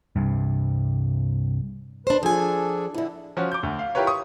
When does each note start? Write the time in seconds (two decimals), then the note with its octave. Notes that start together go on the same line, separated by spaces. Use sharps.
0.16 C2 G2
2.07 D4 B4 C5
2.23 F3 D4 G#4 A4 G#5
2.94 D3 E3 E4
3.37 F3 C#4 F#4
3.52 D6 G6
3.63 D2
3.79 F5
3.95 E4 F4 G4 A#4 B4 C#5
4.07 C#6 D#6